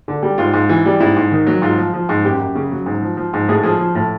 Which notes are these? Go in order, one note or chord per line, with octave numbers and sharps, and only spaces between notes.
D3
G3
G#2 F4
G#2
E3
G3
G#2 E4
G#2
D#3
F#3
G#2 F4
F3
F3
G#2
F#2 G4
F#2
C#3
F#3
G#2
F3
F3
G#2
A2 G#4
F3 G#4
F3
A2